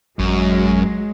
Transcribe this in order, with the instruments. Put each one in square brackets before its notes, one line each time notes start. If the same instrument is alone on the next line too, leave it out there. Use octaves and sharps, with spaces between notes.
[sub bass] A1 [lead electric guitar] F#2 [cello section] F#3 G#3